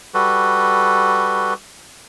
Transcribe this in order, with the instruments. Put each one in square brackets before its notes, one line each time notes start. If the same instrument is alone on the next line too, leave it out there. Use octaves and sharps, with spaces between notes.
[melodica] G3 F#4 A4 B4